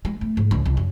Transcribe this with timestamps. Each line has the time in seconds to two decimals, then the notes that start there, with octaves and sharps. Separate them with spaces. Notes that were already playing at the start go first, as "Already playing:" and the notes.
0.05 G#3
0.21 A3
0.37 G#2
0.51 C#2
0.66 C2
0.77 F#2